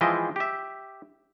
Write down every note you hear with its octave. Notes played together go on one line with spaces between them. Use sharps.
E3 F3 G#3 D#5 E5 G5
G4 E5